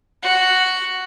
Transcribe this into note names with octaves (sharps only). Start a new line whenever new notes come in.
F#4